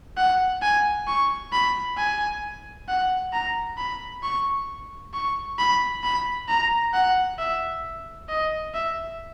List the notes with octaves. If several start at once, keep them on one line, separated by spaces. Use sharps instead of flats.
F#5
G#5
C#6
B5
G#5
F#5
A#5
B5
C#6
C#6
B5
B5
A#5
F#5
E5
D#5
E5